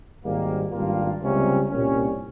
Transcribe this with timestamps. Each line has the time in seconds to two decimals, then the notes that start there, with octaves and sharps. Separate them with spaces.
0.23 G#1 G#2 G3 A#3
0.72 G#1 G2 G3 A#3 F4
1.21 C#2 C3 G3 A#3 C#4
1.70 C2 A#2 G3 A#3 C#4